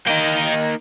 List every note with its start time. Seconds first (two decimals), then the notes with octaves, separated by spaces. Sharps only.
0.08 A#3 D#4 D#5 G5